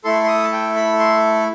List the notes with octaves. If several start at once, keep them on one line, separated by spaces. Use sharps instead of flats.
A3 E4 A4 C6
C6
D#6
A5
G5
B5
C6